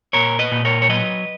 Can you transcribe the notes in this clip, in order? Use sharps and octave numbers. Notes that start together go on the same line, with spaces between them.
A#2 A#4 C#5
B4 D#5
A#2
A#4 C#5
C#5
F#3 B4 D#5